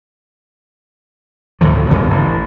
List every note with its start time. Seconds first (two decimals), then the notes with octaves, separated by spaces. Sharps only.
1.61 D2 A2 D#3 F3
1.90 D2 G2 C#3 B3
2.10 A1